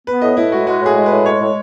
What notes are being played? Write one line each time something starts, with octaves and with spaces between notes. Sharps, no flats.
B3 B4
A2 D#5
A2 E4
G#3 F#4
G#3 F#4
A2 G#4
G#3
B4
A2
G#3 C#5
A2